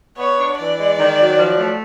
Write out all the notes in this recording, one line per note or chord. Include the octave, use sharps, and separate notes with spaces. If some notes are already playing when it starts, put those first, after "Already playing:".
B3 C#5
D4
E3 D5
G#3
D#3
F#3
F3
A3